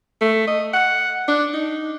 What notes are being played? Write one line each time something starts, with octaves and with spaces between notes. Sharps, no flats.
A3
D#5
F#5
D4
D#4